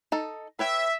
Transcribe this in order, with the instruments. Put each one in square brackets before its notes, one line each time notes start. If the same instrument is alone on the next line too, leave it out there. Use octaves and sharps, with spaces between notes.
[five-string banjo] D#4 A4
[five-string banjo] B4 C#5 G5 [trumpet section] E5